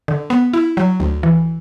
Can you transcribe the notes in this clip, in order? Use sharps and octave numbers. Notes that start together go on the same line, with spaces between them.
D3
B3
E4
F#3
D2
E3